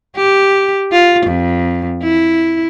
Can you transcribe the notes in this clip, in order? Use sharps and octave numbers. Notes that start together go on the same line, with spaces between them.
G4
F4
F2
E4